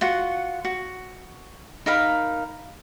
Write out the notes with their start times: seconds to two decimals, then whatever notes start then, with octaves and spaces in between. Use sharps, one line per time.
0.01 F4 F#4 F#5
0.65 F#4
1.86 D#4 A#4 F5 B5